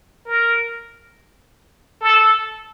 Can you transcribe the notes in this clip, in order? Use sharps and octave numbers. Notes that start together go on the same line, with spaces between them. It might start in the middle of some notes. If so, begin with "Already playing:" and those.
A#4
A4